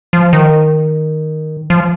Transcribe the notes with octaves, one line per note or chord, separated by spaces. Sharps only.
F3
D#3
F3